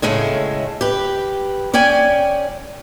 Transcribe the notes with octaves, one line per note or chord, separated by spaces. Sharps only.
A2 C#3 G#3 A3
G4 B4
C#4 D5 G5 G#5